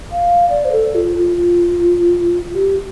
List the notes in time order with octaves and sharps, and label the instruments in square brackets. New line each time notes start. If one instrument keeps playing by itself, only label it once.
[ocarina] F5
D5
C5
A4
F4
F4
G4